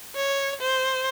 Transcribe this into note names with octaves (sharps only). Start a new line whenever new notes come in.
C#5
C5